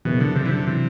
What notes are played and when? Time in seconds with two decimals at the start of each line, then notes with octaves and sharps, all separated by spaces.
0.05 F#1 B2
0.20 F#1 D3
0.36 F#1 C3
0.46 E3
0.51 D3 F#3
0.67 C3 E3